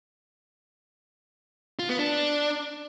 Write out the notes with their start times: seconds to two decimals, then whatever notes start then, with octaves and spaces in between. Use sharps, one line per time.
1.79 F4
1.89 B3
1.99 D4